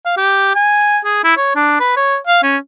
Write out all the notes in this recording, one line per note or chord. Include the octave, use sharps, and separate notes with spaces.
F5
G4
G#5
G#4
E4
C#5
D4
B4
C#5
F5
C#4